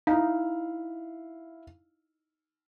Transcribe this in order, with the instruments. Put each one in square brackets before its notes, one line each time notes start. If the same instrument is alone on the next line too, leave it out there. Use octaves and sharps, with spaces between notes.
[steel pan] D#4 [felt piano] E4 F5